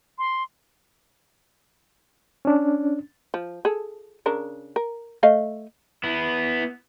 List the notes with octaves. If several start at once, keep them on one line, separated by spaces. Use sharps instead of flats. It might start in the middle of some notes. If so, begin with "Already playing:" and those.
C6
C#4 D4
F3
G#4 A4
C#3 D4 A#4
A#4
A3 D#5 F5
B3 E4